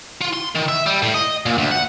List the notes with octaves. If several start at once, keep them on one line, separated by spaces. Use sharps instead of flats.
F4
C6
D#3
E5
G3
A2
D#5
A#2
D2
F#5